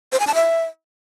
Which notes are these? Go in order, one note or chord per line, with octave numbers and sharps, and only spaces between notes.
C5
G#5
A5
E5